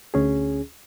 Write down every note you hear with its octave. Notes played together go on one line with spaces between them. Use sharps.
D2 C#4 G#4